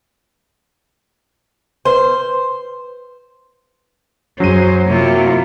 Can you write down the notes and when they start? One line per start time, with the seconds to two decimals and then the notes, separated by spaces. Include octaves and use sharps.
1.85 B4 C5 C6
4.40 F#2 F#3 G3 C#4 G#4 C5 D#7
4.87 C3 A#3 E4 F4